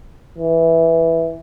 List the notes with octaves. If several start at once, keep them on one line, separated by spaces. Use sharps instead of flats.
E3